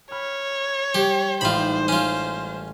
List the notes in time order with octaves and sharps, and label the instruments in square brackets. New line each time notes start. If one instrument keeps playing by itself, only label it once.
[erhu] C#5 [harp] B5 F6
[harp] G3 [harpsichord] G4
[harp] A1 G#3 D#4 [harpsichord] F4 B5 [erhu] C5
[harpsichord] C#4 F4